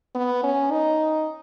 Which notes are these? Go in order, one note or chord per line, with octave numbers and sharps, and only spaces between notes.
B3
C#4
D#4